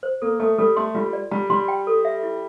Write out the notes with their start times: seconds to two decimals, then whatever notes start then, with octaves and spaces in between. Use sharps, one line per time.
0.03 C5
0.22 A#3 A4
0.40 A3 A4
0.58 G3 A4
0.76 A3 C6
0.95 G3 F4
1.13 D5
1.31 G3 A#5
1.50 G3 C6
1.68 G5
1.87 A4
2.05 E5
2.23 E4